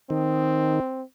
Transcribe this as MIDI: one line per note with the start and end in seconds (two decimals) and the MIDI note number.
0.10 0.80 51
0.10 1.02 60